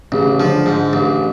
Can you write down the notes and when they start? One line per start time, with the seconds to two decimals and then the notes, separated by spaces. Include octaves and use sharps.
0.12 A1 C#3
0.39 D3 F3
0.66 G#2
0.93 A1